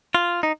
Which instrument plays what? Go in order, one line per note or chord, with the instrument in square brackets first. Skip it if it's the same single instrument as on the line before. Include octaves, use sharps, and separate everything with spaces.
[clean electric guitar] F4
D#4